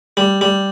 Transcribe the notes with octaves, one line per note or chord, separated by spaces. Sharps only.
G3
G3